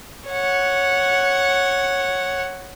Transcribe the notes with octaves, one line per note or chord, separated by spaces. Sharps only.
C#5 F#5